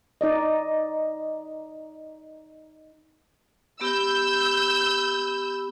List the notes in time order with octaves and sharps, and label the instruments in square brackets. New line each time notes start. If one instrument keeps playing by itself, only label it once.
[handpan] D#4 D5 D#5
[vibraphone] B3 G4 B5 [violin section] E6 G6